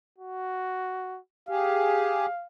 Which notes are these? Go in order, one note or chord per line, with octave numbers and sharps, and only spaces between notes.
F#4
G4 G#4 F5